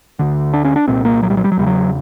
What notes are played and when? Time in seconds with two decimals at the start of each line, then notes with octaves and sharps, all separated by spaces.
0.19 D2 D3
0.54 D4
0.65 C#4
0.76 D4
0.88 C2 A#2 C4
1.05 A#3
1.22 F#3
1.30 G3
1.37 F#3
1.44 G3
1.52 F#3
1.57 E2 C#3 G3
1.66 F#3